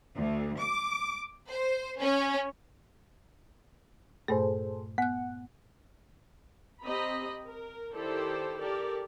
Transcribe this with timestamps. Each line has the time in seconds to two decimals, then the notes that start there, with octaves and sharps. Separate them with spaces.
0.15 D2
0.60 D6
1.49 C5
2.00 C#4
4.28 G2 A#2 A3 G#4 A4 C5
4.98 B3 F#5 F#6
6.83 C4 G4 D#5 A#5 B5
7.44 A#4
7.93 D#3 E4 G4 A4 C5 D5
8.60 G4 A4 A#4 D5